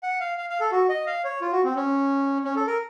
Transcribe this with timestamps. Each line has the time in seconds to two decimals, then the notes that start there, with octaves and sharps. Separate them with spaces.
0.03 F#5
0.20 F5
0.38 F5
0.50 F5
0.60 A4
0.72 F#4
0.89 D#5
1.07 F5
1.24 C#5
1.41 F4
1.52 F#4
1.64 C4
1.76 C#4
2.44 C#4
2.56 A4
2.67 A#4